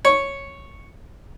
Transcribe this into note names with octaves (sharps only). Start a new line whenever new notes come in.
C#5